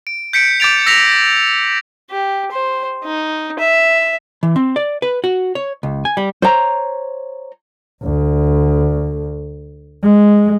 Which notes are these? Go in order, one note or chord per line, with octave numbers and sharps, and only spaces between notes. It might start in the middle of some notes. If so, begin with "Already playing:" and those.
D7
G6 B6 C#7 D7
D6 G6 A6 D7 F7
E6 A#6 B6 C#7 F7
G4
C5
D#4
E5
E3
C4
D5
B4
F#4
C#5
C#2
G#5
G3
C5 C#5 A#5
D2
G#3